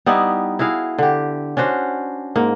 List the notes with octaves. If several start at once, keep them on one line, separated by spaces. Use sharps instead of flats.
G3 B3 D#4 E4
E4 F#4 G#4 F5
D3 G4
C#4 D4 F#4 C5
G#2 A#3